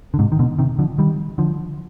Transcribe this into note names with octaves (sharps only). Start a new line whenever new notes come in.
D3
G#2 C3
D#3
B2 D3
C3 D#3
D3 F3
D#3 G3
D3 F3